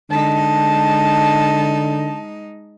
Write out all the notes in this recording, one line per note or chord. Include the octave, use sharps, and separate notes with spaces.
D3 G#3 D#4 A5